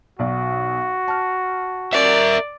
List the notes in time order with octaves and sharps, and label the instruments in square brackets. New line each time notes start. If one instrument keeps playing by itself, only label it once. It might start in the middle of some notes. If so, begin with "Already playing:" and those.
[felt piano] B1 D5 [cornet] F#4
[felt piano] A5 F6
[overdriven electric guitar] A#4 E5 [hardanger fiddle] D5